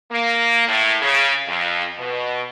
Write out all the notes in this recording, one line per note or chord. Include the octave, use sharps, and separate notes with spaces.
A#3
A2
C#3
F2
B2